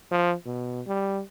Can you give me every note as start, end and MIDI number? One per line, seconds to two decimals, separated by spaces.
0.11 0.34 53
0.45 0.81 47
0.87 1.21 55